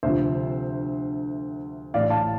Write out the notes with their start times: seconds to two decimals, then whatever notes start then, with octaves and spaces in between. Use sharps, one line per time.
0.03 D2 C3 F3 C5 E5
1.94 A1 A2 E3 D5 F5
2.10 F5 A5